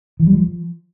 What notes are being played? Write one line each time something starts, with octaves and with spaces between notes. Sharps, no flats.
E3
G3
F3